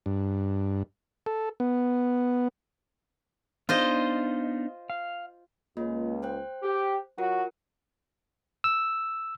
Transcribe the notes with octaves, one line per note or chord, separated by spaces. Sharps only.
G2
A4
B3
B3 D4 D#4 F4 C5 D#5
F5
C#2 A#3 F4 D#5
C5 G5 F#6
G4
F#3 F4 F#4 A#4
E6